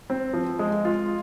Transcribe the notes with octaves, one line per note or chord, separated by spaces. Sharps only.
C4
F3
G#3
F4